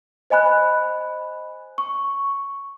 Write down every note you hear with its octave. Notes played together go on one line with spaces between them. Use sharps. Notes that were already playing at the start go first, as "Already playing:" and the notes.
C5 D#5 G#5 B5 F#6
C#6